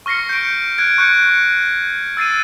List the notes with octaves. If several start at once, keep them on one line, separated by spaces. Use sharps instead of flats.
C#6 F6 A#6 C7 C#7
G6 D7
F#6 G#6 D7
C#6 F#6 G6 C#7
E6 A6 C7 D#7